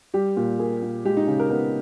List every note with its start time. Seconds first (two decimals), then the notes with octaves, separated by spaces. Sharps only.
0.14 G3 G4
0.37 A#2
0.59 A#3 G#4
0.82 A#2
1.05 G#3 G4
1.17 D#4
1.27 C#3
1.39 A#4
1.50 B3 A#4